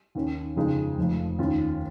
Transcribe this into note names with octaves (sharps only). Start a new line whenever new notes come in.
D#2 D#3 C#4
F2 C#3 F3 G#3 D#4
F1 F2 F3
D#2 D#3 C#4 F4